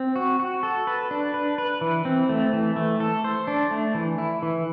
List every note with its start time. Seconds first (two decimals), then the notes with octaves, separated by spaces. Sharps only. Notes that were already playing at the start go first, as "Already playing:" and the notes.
Already playing: C4
0.16 F#4
0.40 F#4
0.63 A4
0.87 B4
1.11 D4
1.34 B4
1.58 B4
1.81 E3
2.05 C4
2.29 A3
2.53 E3
2.76 A3
3.00 A4
3.24 C5
3.48 D4
3.71 A3
3.95 E3
4.18 E4
4.42 E3